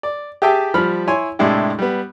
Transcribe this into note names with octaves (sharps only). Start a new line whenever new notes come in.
D5
G4 G#4 E5 G5 A5
F3 G3 B5 F6
E4 C#5 G#5 C6
A2 C3 G#3 D4 E4 G4
G3 B3